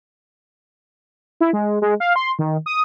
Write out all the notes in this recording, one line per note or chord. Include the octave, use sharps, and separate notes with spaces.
E4
G#3
G#3
F5
C6
D#3
D#6